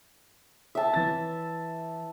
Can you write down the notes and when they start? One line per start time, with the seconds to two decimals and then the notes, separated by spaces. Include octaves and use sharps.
0.75 E5 A5
0.94 E3 A6